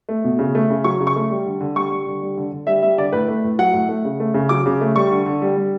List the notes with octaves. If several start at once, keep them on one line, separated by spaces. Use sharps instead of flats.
A3
B2
C#3
A3
C#3
F#3 C#6
C#3
C#6
A3
G3
D3
D3
G3 C#6
G3
D3
G3
D3
D3
G3 E5
G3 E5
D3 D5
A2 B4
A3
A2
F#3 F#5
A2
A3
C#3
A3
C#3
F#3 D6
C#3
A3
G3 C#6
D3
D3
G3
G3